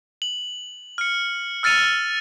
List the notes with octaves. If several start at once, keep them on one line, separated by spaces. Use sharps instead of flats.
F#7
F6 C#7
E6 F6 A6 C#7 D#7 F7